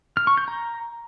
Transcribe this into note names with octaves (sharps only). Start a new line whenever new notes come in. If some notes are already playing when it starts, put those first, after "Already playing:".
F6
C#6
G6
A#5